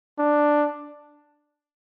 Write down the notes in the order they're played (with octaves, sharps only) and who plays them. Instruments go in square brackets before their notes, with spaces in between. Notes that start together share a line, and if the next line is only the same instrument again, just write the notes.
[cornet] D4